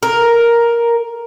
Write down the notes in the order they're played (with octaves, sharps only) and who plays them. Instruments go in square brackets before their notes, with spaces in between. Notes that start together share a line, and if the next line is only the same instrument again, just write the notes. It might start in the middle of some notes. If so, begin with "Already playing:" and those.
[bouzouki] A#4